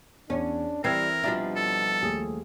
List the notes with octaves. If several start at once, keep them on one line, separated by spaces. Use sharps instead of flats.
E2 C#4 D4
E3 G3 C4 A#4 E6 G#6 C7
B2 F3 G3 D4 F#4 E5 A#5
A4
D#2 A3 G#4